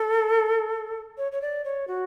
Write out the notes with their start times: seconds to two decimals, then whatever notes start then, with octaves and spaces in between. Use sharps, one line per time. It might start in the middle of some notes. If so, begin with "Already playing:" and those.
Already playing: A4
1.18 C#5
1.32 C#5
1.42 D5
1.64 C#5
1.88 F#4